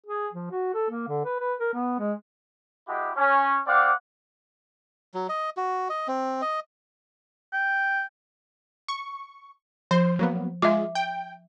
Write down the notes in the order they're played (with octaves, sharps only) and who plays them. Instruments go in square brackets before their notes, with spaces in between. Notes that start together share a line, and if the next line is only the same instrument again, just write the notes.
[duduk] G#4
F3
F#4
A4
A#3
D3
B4
B4
A#4
B3
G#3
[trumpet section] G#3 E4 F#4 G4
C#4
C4 D5 F5 F#5 D6
[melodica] F#3
D#5
F#4
D#5
C4
D#5
[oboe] G5
[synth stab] C#6
[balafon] F3 [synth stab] C5
[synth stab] F#3 A#3 B3
[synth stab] G#3 F4 [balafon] E5 D6
[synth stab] G5